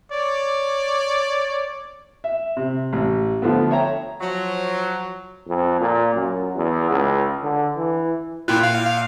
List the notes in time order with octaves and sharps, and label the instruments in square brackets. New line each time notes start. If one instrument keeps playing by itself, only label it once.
[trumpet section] C#5 D5
[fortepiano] E5
C3
A1
D3 F3 A3 B3
C#5 E5 G5 A#5
[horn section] F3 F#3
[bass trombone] F2
A#2
F#2
E2
C#2
D3
E3
[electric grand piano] A#2 G5 F#6 [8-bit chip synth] E4 F4
[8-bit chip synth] F5